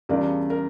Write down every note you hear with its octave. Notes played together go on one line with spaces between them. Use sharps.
E2 C#3 G3 D4 F4 A#4 D5
A#4